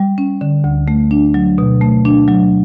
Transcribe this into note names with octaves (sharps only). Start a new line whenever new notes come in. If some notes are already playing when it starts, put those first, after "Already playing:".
Already playing: G3
C#4
D3
D2
A3
D4
F#3
B2
A3
D4
F#3